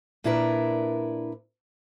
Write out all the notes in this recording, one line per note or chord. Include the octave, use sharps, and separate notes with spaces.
A#2 D4 E4 A#4 B4